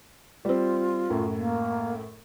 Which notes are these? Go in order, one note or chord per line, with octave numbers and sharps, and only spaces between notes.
G3 C4 F4
F#2 A2
A#3